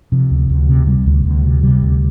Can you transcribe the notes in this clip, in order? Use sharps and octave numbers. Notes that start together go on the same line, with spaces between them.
C3 F3
D2
D2
C3
C3 G3
D2
D2
C3
C3 G3
D2